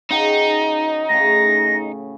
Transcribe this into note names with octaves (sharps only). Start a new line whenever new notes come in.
C#3 D#4 F#4 G5
A2 C#3 A#6